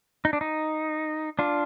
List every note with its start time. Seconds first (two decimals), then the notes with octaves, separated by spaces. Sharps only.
0.25 D#4
0.33 D4
0.41 D#4
1.39 D4 F4